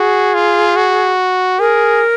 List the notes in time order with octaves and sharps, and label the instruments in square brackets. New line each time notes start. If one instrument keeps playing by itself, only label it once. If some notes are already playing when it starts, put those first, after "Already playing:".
Already playing: [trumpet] F#4 [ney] G#4
[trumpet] F4
F#4
[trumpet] G#4 [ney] A#4